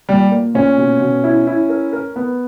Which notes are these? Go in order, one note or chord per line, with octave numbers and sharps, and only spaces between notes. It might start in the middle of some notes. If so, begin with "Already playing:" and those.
A#2 G3
A#3
A#2 C#4
B2
B2
E4
E4
A#4
A#4
B3